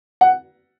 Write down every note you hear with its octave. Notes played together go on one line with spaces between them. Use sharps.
F#5